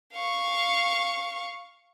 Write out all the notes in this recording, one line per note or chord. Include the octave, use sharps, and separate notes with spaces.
F5 C#6